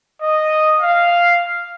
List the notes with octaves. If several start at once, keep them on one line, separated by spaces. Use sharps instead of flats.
D#5
F5